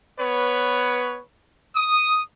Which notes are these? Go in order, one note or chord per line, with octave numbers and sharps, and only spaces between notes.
B3 B4 C#5
D#6